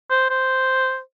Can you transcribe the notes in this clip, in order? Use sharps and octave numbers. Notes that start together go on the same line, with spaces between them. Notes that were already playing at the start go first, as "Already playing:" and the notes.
C5
C5